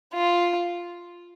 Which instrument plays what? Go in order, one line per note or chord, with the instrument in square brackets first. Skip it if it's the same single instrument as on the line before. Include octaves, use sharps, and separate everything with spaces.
[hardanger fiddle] F4